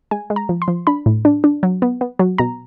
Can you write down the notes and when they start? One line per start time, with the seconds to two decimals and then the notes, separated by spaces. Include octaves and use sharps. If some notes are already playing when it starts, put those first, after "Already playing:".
0.11 G#3 G#5
0.30 G#3
0.36 A#5
0.49 F3
0.62 C6
0.68 F3
0.87 D4 B5
1.06 A2
1.25 D4
1.44 D4
1.63 F#3
1.82 B3
2.01 B3
2.19 F#3
2.38 B2 A#5